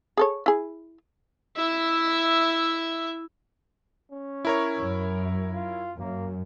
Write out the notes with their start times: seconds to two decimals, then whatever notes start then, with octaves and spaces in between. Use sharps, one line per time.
0.17 G#4 A4 C#5
0.46 E4 G#4
1.56 E4 E5
4.12 C#4
4.45 E4 A#4 C#5
4.80 F#2
5.54 F4
5.99 F#2 A#3